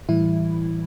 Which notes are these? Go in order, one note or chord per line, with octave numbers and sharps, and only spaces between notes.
A2 E3 G3 E4